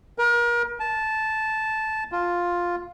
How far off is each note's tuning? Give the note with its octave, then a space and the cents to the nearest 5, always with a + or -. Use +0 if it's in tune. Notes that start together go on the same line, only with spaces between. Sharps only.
A#4 +35
A5 -10
F4 +5